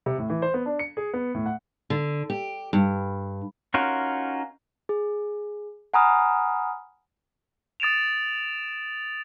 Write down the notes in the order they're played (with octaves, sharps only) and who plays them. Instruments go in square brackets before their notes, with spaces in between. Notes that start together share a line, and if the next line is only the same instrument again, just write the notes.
[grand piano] C3
A2
E3
C5
B3
D4
C#7
G#4
B3
A2
F#5
[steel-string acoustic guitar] D3
G4
G2
[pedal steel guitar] C#4 D#4 F4 F#4 A#4
[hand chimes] G#4
F#5 G#5 A#5 B5 D#6 F6
[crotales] D#6 A6 D7 E7 F7